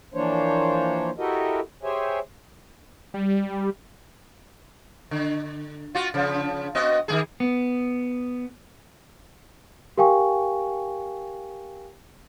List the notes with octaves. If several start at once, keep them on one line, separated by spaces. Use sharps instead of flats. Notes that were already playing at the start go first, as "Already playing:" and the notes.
E3 F3 A#3 D4 C5 C#5
E4 F#4 G4 A4 A#4 D#5
G4 G#4 C5 C#5 E5 G#5
G3
D3
F4 F#4
C#3 F3
B3 F#4 D#5
D#3 G#3 G#4
B3
G4 A#4 F5 G5 G#5 C#6